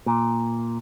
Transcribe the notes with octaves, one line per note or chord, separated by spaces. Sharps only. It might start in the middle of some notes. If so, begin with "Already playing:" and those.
A#2